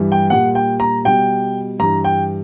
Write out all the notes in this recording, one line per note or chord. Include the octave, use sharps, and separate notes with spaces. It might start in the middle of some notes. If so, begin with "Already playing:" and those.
Already playing: G2 E3 G3
G5
A#2 G3 F#5
G5
A#5
B2 G3 G5
G2 E3 G3 A#5
G5